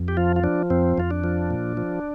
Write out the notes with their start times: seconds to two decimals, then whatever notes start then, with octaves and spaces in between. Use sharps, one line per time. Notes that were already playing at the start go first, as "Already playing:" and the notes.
Already playing: F2
0.08 G4
0.17 F3 F4
0.36 F4
0.44 F3 D4
0.70 F2 C4
0.98 F2 F4
1.11 D4
1.24 F3
1.50 A#2
1.77 F3